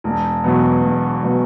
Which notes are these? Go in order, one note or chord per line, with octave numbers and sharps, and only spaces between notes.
E1
E2 B2 F#3 B3
E1
B2 F#3 B3